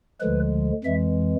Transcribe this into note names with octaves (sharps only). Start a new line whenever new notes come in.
D2 D3 F3 G#3 B4
F2 E3 G#3 E5